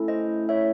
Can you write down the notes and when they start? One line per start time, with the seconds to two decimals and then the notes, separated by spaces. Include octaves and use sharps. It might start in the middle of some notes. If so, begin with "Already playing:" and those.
Already playing: A3 C#4 E4 A4
0.08 C5 D#5
0.49 C#5 E5